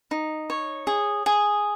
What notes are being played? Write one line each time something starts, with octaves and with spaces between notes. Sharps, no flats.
D#4
C#5
G#4
G#4